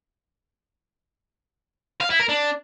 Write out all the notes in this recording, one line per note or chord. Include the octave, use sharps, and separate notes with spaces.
F5
E4
A#4
D4